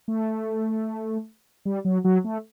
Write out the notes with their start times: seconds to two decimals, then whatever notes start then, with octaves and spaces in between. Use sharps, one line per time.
0.08 A3
1.65 G3
1.85 F#3
2.04 F#3
2.24 A3